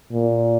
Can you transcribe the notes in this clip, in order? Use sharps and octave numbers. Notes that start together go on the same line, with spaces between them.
A#2